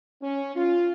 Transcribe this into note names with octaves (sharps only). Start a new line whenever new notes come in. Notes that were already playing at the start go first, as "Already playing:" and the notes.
C#4
F4